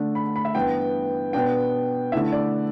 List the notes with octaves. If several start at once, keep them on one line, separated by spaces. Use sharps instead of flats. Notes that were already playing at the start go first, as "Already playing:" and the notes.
Already playing: D3 A3 D4
B5
B5
E5
G2 E3 B3 E4 G5
B2 B3 D4 G5
D3 A3 E4 E5
D5